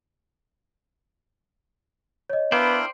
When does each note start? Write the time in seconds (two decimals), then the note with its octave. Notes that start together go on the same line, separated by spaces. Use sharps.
2.30 C#5 D#5
2.52 B3 D4 E4 A#4 C5 D5 F5 G5